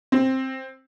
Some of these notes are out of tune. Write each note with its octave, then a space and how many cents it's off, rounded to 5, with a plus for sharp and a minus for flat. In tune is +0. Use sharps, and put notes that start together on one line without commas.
C4 +10